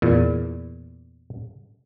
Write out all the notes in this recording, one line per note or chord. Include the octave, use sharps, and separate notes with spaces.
E2 A#2